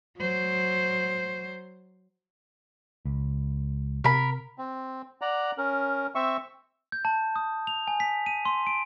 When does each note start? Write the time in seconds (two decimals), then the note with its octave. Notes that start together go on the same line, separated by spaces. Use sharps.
0.18 F#3 C5
3.05 C#2
4.04 C3 A#4 B5
4.58 C4
5.21 D5 F#5 A#5
5.58 C#4 A#4
6.15 C4 E5 C#6
6.92 G6
7.05 A5
7.36 D#6
7.67 F7
7.88 G#5
8.00 B6
8.26 D#7
8.45 C6
8.67 D7